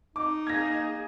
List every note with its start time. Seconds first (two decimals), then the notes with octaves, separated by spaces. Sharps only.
0.16 D#4 D6
0.47 A#3 G#4 G#6 A#6